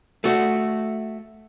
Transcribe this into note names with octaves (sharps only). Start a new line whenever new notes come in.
A3 F#4